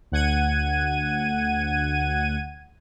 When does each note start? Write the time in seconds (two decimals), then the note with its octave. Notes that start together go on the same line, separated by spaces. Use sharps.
0.11 D2 F#5 G#6 D#7